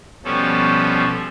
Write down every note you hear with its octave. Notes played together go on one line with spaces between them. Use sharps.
B2 F3 G3 C#4 A4